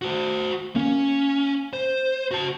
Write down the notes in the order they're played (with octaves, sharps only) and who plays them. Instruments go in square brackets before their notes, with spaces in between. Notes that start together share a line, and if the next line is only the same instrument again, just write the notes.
[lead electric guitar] F#4 C5
[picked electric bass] A#3 [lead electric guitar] C#4
[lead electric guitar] C5
F#4 A5